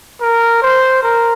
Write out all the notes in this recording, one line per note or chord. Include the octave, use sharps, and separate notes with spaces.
A#4
C5
A#4